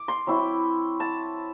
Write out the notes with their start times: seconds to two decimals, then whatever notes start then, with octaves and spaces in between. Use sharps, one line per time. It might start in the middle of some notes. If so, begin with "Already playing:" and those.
Already playing: D6
0.08 C6
0.27 F#3 C4 E4
1.00 A5